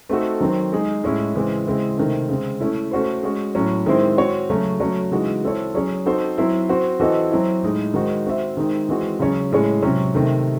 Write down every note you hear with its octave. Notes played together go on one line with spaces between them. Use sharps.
A3 C4 D#4 F#4 A4
D#3 F#3 C4
G#3 D#4 G#4
A2 G#3 C#4 E4
C#3 E3 G#3 C4
C#3 G#3 C4 E4
C3 D#3 A3 C4
C#3 G#3 C4
A3 C#4 E4
A3 C#4 F#4 C5
G#3 C#4 F#4
A2 F#3 C#4
D#3 G#3 C4 E4 C5
C4 F#4 C#5
C#3 F#3 A3 C#4
F#3 A3 C#4 F#4 C#5
C#3 E3 G#3 D#4 F#4
C4 E4 A4 C#5
F#3 C#4 G#4 C#5
C4 D#4 F#4 A4 C5
F#3 C4 E4 C5
C4 F#4 C5
E3 C4 F#4 A4 D#5
F#3 C4 E4
A2 G#3 D#4
D#3 G#3 D#4 F#4 C5
C4 F#4 C5 E5
D#3 G#3 C4 D#4
E3 G#3 C4 F#4
C#3 F#3 C#4 G#4 C#5
A2 G#3 C#4 G#4 C#5
C3 F#3 C#4
C3 D#3 A3